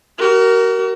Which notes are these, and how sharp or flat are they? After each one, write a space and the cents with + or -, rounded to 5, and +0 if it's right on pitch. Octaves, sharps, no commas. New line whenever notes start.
F#4 +40 A#4 +0